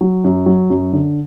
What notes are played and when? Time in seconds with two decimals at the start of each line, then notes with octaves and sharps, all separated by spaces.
0.01 F#3
0.24 F#2
0.46 F#3
0.70 F#2
0.93 D3